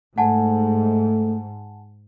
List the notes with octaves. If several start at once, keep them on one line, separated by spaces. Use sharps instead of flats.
G#2 A3 F#5 G#5 A5